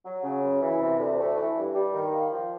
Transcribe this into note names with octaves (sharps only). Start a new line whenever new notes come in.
F#3
C#3
F#2
E3
C3
D2
A3
E3
G2
G3
D#3
A#3
F3